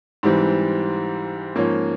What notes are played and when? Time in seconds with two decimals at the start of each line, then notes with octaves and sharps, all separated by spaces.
0.23 G#2 E3 G3 C4
1.56 G#2 F3 A#3 C#4